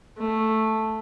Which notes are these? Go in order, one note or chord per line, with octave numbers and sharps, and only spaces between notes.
A3